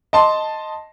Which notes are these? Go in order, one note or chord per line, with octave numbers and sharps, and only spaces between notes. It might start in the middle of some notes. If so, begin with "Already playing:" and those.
D#5 A5 C6